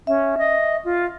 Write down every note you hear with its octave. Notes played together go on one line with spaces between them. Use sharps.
C#4 E5
D#5
F4